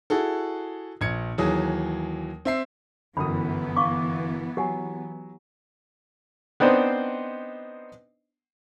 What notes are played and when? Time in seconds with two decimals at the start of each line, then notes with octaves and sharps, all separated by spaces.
0.10 E4 F#4 G#4 A4
1.01 A#1 G#6 C#7
1.38 D#2 E3 F#3 G#4 D#6
2.45 C4 E5 C7
3.17 G1 F#2 E3 B3 B5 D#6
3.77 F5 C#6 D6
4.57 F#3 G4 F#5 G#5
6.60 B3 C4 D4 D#4 C5